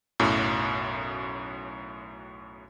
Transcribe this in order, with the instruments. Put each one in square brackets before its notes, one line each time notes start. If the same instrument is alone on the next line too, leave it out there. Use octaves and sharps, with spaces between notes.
[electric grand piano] B1 F#2 A2